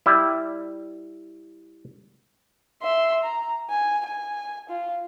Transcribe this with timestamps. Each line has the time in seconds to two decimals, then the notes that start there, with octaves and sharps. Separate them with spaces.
0.06 G3 E4
2.82 E5 C6
3.23 A#5
3.70 G#5
4.05 G#5
4.69 F4